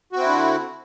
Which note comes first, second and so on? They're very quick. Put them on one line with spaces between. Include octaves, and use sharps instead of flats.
F#4 C4 E4 D3